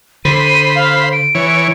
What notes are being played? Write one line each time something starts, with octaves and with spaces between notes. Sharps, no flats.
D3 C5 B5 D#7
F5
D7
E3 C#5